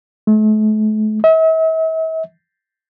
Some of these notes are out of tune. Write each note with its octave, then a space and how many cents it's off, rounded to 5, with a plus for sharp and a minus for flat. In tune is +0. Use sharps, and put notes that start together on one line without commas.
A3 -40
E5 -45